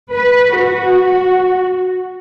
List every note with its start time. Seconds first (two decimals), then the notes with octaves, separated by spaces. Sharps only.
0.11 B4
0.57 F#4